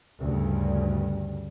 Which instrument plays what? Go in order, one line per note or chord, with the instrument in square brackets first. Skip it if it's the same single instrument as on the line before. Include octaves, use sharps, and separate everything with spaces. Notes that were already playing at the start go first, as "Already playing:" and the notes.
[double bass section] D2 G2 C#3